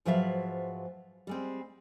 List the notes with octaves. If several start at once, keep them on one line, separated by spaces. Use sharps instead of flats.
G#2 F3 F#3 B4 E5 F5
G3 G#3 C4